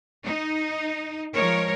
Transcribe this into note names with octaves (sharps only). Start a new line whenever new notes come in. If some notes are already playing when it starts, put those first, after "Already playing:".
D#4
F3 G#3 A#4 C#5